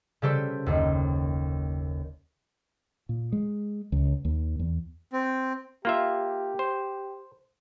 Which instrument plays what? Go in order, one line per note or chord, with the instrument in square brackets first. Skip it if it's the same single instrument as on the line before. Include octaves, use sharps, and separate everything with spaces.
[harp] C#3 G3 G4 A4 B4 C5
F#1 D#2
[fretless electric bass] A#2
G#3
C#2
D#2
E2
[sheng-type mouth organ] C4
[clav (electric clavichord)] A#3 F4 E5 [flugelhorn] G4
[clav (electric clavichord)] C5